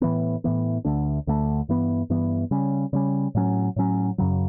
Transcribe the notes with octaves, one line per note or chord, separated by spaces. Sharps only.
A2 E3 B3
A2 E3 B3
D2 D3 A3 D4
D2 D3 A3 D4
G2 E3 B3
G2 E3 B3
C#3 G3 C#4
C#3 G3 C#4
A2 F#3 C#4
A2 F#3 C#4
F#2 C#3 F#3